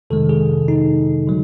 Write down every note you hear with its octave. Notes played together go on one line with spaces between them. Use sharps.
F2 C3 D#3 G#3 A4
G#4
D#4
D3 F#3